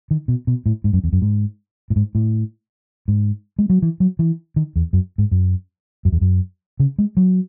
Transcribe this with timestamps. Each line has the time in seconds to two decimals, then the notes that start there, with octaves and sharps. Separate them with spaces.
0.11 D#3
0.28 B2
0.47 B2
0.66 A2
0.84 G#2
0.93 F#2
1.04 E2
1.13 F#2
1.22 G#2
1.90 A2
1.96 G#2
2.15 A2
3.08 G#2
3.59 G#3
3.70 F#3
3.82 E3
4.00 F#3
4.19 E3
4.56 D#3
4.76 E2
4.93 F#2
5.18 G#2
5.31 F#2
6.05 F#2
6.12 E2
6.21 F#2
6.80 C#3
6.98 G#3
7.17 F#3